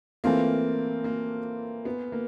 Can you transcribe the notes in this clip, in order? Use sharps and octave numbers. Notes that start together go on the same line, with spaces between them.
E3 A3 A#3 C4 F4
A#3
B3
A#3